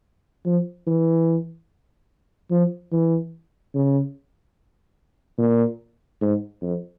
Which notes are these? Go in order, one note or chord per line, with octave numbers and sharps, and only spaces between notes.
F3
E3
F3
E3
C#3
A#2
G#2
F2